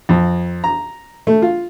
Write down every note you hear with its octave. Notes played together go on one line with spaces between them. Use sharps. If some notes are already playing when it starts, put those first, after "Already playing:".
F2
A#5
A3
F4